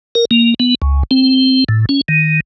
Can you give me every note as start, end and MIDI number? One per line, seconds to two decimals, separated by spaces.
0.15 0.25 70
0.31 0.54 58
0.60 0.75 59
0.82 1.03 37
1.11 1.64 60
1.69 1.85 45
1.89 2.01 61
2.08 2.40 51